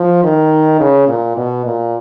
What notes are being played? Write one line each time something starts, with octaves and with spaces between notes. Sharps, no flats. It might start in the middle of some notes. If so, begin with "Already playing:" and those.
Already playing: F3
D#3
C#3
A#2
B2
A#2